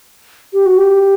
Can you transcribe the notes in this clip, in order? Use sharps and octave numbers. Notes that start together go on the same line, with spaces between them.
G4
F#4
G4